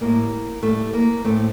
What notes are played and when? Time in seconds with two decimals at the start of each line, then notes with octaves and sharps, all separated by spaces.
0.01 A2 G3 A#3
0.62 A2 G3 A3
0.93 A#3
1.25 A2 A3 C4